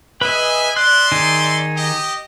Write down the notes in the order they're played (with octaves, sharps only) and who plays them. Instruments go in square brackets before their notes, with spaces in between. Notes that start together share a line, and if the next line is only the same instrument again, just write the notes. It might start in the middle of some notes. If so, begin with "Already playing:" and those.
[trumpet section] G#4 E5 G#5 [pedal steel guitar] B4 D#5
[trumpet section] D5 E5 C6 [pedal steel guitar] F#6
[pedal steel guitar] D#3 D#4 G#4
[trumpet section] G4 D#5